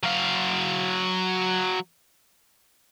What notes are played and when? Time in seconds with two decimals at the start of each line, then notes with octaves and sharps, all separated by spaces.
0.03 F#3 F5